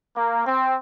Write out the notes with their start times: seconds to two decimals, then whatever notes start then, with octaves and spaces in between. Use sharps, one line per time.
0.15 A#3
0.45 C4